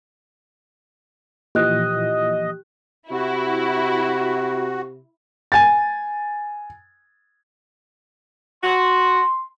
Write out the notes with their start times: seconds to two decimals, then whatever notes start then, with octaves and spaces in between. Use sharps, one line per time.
1.55 A#2 E3 F3 G4 D#5 F#6
3.11 C3 E4 F#4
5.52 G#5 A6
8.64 F#4 C6